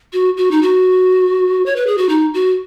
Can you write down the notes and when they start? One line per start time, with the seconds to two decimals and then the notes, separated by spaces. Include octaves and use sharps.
0.13 F#4
0.37 F#4
0.51 D#4
0.62 F#4
1.66 C#5
1.76 B4
1.87 G#4
1.98 F#4
2.09 D#4
2.34 F#4